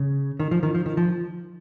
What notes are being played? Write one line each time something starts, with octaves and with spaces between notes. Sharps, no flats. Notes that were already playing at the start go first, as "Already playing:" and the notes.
Already playing: C#3
D#3
F3
D#3
F3
D#3
F3